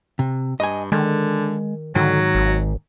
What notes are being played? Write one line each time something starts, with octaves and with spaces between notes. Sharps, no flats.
C3
G2 D#5 G#5
D3 D#3 G#3
G#2 D3 D#3 F#3
G#1